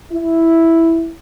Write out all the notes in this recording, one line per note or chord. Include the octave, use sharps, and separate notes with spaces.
E4